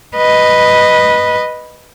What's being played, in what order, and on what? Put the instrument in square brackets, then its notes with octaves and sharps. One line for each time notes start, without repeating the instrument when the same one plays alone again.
[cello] B4 D#5